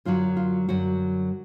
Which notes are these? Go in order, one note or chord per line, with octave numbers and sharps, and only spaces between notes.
F#2 D3 F#3 F4
F4
F#2 D3 F#3 F#4